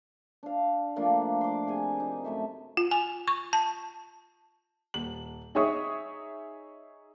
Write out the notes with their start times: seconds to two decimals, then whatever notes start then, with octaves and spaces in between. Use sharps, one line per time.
0.43 D4 F5
0.96 F3 A3 A#3 D4
1.41 C6 D6
1.67 C3 G#4 G#5
2.00 D#4
2.24 F#2 A3 E5
2.77 F4
2.91 G#5
3.28 C#6
3.53 A5
4.94 D#1 F#7
5.55 D#4 G#4 C#5 E5 C#6 D#6